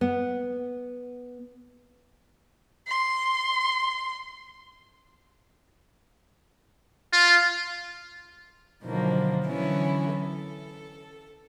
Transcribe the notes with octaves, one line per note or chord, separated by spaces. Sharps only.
B3
C6
F4
B2 D3 D#3 F3 F#3 A#3
D3 E3 F#3 B3 C#4 E4
A4